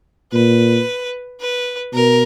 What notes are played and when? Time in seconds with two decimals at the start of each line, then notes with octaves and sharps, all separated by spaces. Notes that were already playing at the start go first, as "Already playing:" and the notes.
0.32 A#2 B4
1.40 B4
1.94 B2 A#4